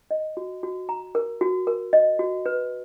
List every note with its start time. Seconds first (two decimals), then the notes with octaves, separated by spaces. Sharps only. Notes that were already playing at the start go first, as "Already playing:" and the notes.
0.11 D#5
0.37 F#4
0.63 F#4
0.89 A#5
1.15 A#4
1.41 F#4
1.67 A#4
1.93 D#5
2.19 F#4
2.46 B4